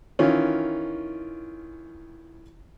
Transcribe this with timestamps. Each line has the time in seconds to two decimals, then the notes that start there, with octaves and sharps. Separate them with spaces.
0.19 D#3 E3 C#4 F4